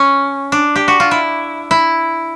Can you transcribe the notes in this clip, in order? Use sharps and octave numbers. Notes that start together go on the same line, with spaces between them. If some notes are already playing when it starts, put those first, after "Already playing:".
Already playing: C#4
D4
G4
F#4
F4
E4
E4